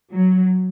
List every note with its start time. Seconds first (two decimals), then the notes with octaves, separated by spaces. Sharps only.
0.13 F#3